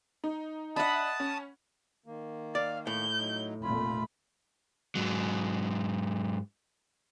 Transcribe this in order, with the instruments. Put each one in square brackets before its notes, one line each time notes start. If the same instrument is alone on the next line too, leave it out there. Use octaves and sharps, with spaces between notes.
[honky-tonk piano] D#4
[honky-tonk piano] D4 D#5 E5 [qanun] F#5 B5 [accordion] A5 D#6
[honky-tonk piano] C#4
[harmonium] D#3 A#3
[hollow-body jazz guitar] D5 [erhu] F5
[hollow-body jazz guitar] A2 [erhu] G6
[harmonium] F#3 D#4
[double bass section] F1 A#2 A3 [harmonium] F4 [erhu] B5
[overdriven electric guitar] G#2 F#3